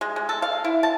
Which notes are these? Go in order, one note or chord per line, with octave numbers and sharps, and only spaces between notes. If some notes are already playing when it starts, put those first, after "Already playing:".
G#3
G#3
A4
F5
E4
A5